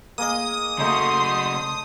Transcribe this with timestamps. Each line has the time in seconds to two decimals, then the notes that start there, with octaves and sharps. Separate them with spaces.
0.18 A#3 G#4 D#5 D#6
0.79 C#3 A3 D#4 F#4 C6